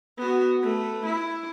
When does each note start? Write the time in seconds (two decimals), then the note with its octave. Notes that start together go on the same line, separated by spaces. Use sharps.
0.18 B3 F#4
0.60 A3 B4
1.06 E4